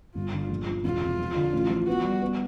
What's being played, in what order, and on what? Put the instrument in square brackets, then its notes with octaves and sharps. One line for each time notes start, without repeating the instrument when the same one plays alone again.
[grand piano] G1 [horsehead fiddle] F4
[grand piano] D3
A#1
F3
[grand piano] E1 [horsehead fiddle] F4
[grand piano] C3
F3
D3
A1
F3
[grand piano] B3 [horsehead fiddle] F#4
[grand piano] G3
B3